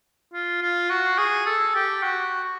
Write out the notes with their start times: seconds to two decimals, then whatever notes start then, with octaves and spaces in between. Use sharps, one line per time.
0.34 F4
0.62 F4
0.90 F#4
1.18 G#4
1.46 A4
1.75 G4
2.03 F#4